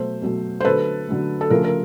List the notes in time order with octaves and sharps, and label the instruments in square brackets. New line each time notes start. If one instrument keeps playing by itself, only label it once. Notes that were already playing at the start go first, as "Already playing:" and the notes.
Already playing: [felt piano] B2 F#3 A3 C5
B2 F#3 A3
C5
D3 F#3 A3 A4 B4
D3 F#3 A3
A4
C#3 F3 A3 A#4
A#4